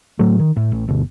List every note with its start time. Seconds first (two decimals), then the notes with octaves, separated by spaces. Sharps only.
0.19 A2 F#3 A3
0.39 D#3
0.56 A2
0.72 A1
0.88 G1 D2 B2